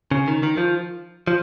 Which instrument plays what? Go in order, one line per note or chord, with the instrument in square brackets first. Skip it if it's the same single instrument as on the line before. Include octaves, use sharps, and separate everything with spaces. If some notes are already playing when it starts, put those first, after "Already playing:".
[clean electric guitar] C#3
D#3
D#3
F3
F3